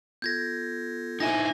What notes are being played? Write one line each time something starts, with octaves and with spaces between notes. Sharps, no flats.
B3 F4 A4 G6 G#6 A#6
D#4 E4 C5 G#5 A#6